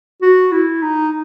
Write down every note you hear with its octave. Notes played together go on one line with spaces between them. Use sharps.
F#4
E4
D#4